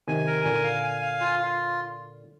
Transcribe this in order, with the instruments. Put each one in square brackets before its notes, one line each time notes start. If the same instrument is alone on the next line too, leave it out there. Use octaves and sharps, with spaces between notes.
[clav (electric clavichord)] C3 D#3 [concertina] G#5
[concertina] A#4
[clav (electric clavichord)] A#2 D3 [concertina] G#5
[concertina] F5
G#5
F5
F4
F4